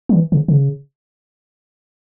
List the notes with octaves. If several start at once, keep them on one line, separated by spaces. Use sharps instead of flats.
F#3
E3
C#3
C#3